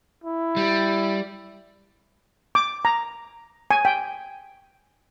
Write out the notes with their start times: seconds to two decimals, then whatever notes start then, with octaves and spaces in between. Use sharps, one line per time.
0.24 E4
0.56 G3
2.55 D6
2.85 A#5
3.71 G#5
3.85 G5